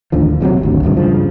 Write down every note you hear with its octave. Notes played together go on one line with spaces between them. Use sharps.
A1 D#2 D3 F3
B1 C3 E3 F#3
G#1 D2
D#1 C#2 G2 C3
G2 C#3 F3